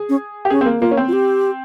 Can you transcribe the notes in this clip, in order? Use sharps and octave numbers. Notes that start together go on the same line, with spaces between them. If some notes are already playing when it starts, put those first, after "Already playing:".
Already playing: G#4
C#4
G4
C#4 G#4
C4
A#3
A#3 F4
C#4
C4
F4
G4